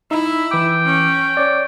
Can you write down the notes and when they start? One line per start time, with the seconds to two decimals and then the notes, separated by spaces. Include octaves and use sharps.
0.11 D#4 E4 E5
0.51 E3 G5 D6
0.86 C#4
1.37 C#5 D5